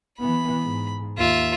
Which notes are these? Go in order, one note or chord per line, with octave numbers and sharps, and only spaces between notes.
E3 B3 B5
G#2
D#2 F4 E5